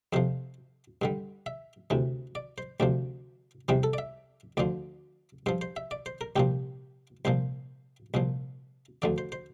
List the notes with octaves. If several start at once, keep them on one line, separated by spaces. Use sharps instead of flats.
F2 C3 F3 C5
G2 D3 G3
E5
D2 C3 E3
D5
C5
D2 C3 F3 D5
E2 C3 E3 G3 C5
A4
D5
E5
D2 D3 F3 D5
G2 F3 C5
C5
E5
D5
C5
A#4
C2 A#2 F3 G4
C2 A#2 F3 C5
C2 A#2 F3
D2 D3 F3 D5
C5
C5